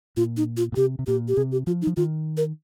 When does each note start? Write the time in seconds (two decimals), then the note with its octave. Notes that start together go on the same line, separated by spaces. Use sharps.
0.17 A#2 F4
0.37 D#4
0.57 F4
0.72 A#2
0.76 C3 G4
0.99 C3
1.07 A#2 G4
1.28 G4
1.37 C3 G#4
1.52 G4
1.67 F3 F4
1.82 D#4
1.87 F3
1.97 D#3 F4
2.37 A#4